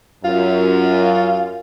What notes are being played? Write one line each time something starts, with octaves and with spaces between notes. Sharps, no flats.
F#2 F4